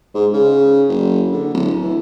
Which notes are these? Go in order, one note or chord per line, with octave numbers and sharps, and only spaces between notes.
G#2
C#3
F#1
D3
D1
E3